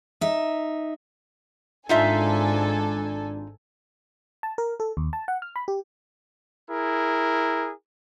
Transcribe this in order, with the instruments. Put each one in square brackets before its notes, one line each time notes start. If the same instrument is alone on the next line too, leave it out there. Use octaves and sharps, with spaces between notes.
[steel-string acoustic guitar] D#4 E5
[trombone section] G#1 D4 [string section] G#2 A4 G#5 [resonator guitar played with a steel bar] D#4 F4 E5
[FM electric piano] A5
A#4
A4
D#2
A5
F#5
F6
B5
G4
[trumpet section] E4 G#4 A#4